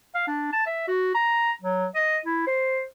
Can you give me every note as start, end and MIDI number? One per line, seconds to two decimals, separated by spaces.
0.15 0.23 77
0.27 0.48 62
0.53 0.64 81
0.66 0.85 76
0.88 1.12 66
1.15 1.52 82
1.62 1.86 54
1.95 2.18 75
2.25 2.45 64
2.47 2.84 72